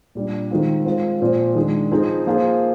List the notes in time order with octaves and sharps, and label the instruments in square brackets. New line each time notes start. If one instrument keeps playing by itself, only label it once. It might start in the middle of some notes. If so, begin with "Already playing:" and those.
[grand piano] A#2 G3 D4
D#3 G#3 C4 F4
G#3 C4 F4
A#2 F3 C4
D#3 G#3 D4
F3 C4 D#4 G#4 C5
F3 A#3 F4 G#4 C5